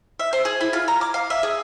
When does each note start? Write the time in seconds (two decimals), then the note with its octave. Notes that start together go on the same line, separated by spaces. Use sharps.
0.19 E5
0.33 C5
0.45 G#4
0.61 E4
0.73 F4
0.88 A#5
1.01 D6
1.14 F5
1.30 E5
1.43 G#4